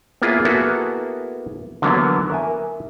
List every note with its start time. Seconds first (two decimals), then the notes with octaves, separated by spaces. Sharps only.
0.22 A#3 B3 E4 F4 G#4
0.45 A#3 B3 E4 F#4 G#4 A4
1.82 D3 E3 F#3 A#3 B3
2.30 A#4 E5 G#5